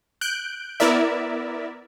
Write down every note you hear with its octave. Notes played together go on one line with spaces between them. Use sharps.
F#6 G6 D7
B3 E4 A#4 D5 E5